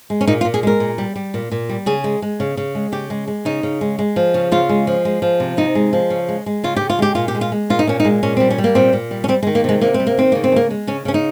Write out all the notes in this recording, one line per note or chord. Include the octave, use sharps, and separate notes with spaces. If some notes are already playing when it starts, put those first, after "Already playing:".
G#3
C#4
A#2 D#4
F4
A#2
G#4
G#3 A#4
A#2
G3
G3
A#2
A#2
G3
C#3 G#4
G#3
G#3
C#3
C#3
G#3
C#3 G4
G#3
G#3
C#3 D#4
C#3
G#3
G#3
F3
C#3
C#3 F4
G#3
F3
G#3
F3
C3
C3 D#4
G#3
F3
C#3
G#3
G#3
C#3 F4
C#3 G4
F4
G#3 G4
A#2 F4
G4
G#3
F4
G#3
A#2 F4
D#4
A#2 C#4
D#4
G#3
A#2 C#4
G3 C4
C#4
G3
A#3
A#2 C4
A#2
G3
C#4
G3 C4
G#3
D#3
A#3
C3 G#3
C3 A#3
C4
G3
A#3
D#3 C4
C#3 A#3
C4
G#3
A#3
G#3
C#3 C#4
C#3 C#4
D#4